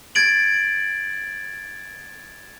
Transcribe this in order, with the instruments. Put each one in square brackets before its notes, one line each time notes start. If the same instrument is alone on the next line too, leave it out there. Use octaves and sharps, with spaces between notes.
[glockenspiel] G#6 A6 D7 F#7